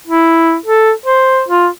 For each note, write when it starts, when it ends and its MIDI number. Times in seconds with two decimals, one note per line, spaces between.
0.07 0.56 64
0.66 0.92 69
1.06 1.43 72
1.48 1.68 65